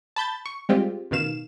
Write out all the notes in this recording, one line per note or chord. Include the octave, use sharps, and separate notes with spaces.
A5 B5 G6 A6
C#6
G3 G#3 C4 F4 G4
A1 B2 D#3 F5 E7